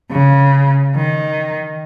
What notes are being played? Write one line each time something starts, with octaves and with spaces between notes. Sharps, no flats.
C#3
D#3